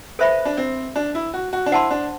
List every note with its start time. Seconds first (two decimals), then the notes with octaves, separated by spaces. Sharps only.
0.19 A4 B4 C5 E5 B5
0.45 D4
0.57 C4
0.96 D4
1.15 E4
1.33 F#4
1.53 F#4
1.66 D4
1.72 E4 C5 F#5 A5 C6
1.90 D4